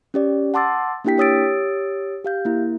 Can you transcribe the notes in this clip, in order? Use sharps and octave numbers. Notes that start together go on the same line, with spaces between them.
C#4 G4 D5
F#5 A5 C6 D6 E6 A6
A#3 D4 E4 G4 G5 B6
G4 C#5 D#6 E6 A6 D7
G4 F5 G6
A#3 E4